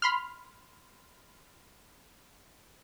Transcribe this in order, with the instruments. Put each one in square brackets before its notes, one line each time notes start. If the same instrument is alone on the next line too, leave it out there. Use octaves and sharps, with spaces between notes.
[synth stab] B5 C6 F6